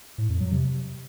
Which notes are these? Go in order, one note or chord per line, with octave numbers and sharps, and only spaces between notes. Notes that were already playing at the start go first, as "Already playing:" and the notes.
A2
F2
F#3
C3